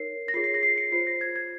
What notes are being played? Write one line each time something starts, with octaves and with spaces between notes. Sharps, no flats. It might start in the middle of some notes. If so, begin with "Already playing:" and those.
Already playing: D#4 A#4 C#5 C7
A#6
F4 G#4 C#5 C7
C7
A#6
C7
C#7
F4 C5 C7
A#6
G#6
G#6